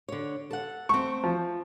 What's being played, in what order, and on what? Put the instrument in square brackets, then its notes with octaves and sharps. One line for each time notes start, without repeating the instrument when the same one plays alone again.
[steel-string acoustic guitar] D3 C#5
A4 F#5
[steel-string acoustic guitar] A3 C4 [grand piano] C#6
[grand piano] F3